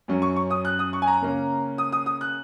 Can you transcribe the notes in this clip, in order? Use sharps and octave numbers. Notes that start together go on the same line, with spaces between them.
F#2 F#3 C#4
C#6
C#6
D#6
F#6
D#6
C#6
G#5
A#5
C#3 A#3 C#4
D#6
D#6
D#6
F#6